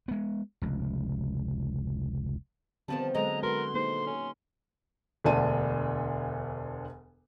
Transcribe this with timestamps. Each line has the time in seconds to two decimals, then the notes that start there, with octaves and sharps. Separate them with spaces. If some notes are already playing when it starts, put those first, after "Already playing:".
0.08 G#3 B3
0.62 F1 C#2
2.88 D3 D#3 F3 G3 B3 C4 A5
3.14 D3 F#3 G#3 D#5 A#5
3.43 F#4 A#4 B4 C6
3.74 A#3 D#4 G#4 C5
4.07 C#4
5.24 E1 D2 D3 D4 A5 D#7